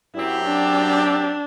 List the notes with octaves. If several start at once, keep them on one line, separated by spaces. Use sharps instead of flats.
F#2 F#3 C4 E4 G4
D4